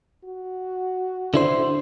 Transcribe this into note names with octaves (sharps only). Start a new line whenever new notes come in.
F#4
D3 D4 E4 C5